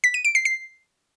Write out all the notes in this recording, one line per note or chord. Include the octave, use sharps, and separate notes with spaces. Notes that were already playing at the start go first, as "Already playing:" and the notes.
B6
D#7
D7
C7
C7